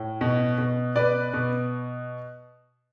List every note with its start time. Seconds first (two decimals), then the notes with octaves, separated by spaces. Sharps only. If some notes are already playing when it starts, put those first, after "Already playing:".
Already playing: A2
0.21 B2
0.58 B2
0.96 B2 B4 D5
1.33 B2